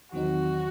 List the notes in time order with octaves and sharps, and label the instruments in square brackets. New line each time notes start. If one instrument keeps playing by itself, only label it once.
[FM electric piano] E2 D#3 F#3 C4 D#4 [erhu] F#4